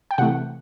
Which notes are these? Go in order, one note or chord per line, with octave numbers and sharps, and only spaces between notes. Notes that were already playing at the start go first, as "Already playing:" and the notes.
G5
C3 E3 A3 F#5